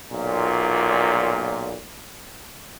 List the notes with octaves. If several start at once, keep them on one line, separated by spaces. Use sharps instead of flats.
B1 A#2